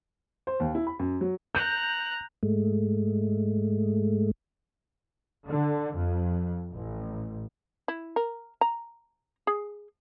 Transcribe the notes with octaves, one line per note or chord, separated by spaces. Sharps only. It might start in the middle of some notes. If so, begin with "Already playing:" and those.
C5
D#2
E4
B5
F#2
F#3
A#5 F#6 G6
G#2 G#3 A3
D3
F2
A1
E4
A#4
A#5
G#4